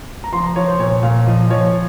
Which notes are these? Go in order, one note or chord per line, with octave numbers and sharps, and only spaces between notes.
A#5
F3 C6
A#5
F3 C#5
C5
A#2 C#5
A#2 F5
F3 D#5
F3 C#5